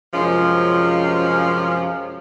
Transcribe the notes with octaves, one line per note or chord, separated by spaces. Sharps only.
F#2 C3 F3 G#3 C#4 F4